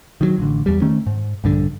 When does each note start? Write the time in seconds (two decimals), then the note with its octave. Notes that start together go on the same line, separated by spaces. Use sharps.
0.21 D#3 E3 F#3
0.38 A1 D3
0.66 E2 G3
0.82 D#3 A3 C#4
1.07 G#2
1.44 A#1 G2 D3